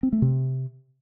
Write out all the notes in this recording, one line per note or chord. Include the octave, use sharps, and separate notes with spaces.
C4
A3
C3